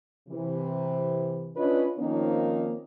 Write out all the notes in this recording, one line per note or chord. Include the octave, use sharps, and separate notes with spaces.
C3 E3
C#4 D4 F4 B4 C#5 D#5
D#3 F3 A#3 C4 C#4 D#4